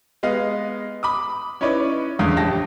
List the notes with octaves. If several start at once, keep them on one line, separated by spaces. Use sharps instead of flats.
G#3 B3 D#5 F5
B5 D6 D#6
C#4 D#4 E4 B4 C#5 D5
F#1 E2 D3 A3 F5 D#6
A#1 G4 A5 A#6